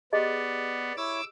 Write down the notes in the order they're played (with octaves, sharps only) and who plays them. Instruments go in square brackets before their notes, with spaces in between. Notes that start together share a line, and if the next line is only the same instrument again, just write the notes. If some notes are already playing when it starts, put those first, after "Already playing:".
[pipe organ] B3 [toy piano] G4 G#4 D#5 [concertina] D5
[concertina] E4 C#5 [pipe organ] D6 E6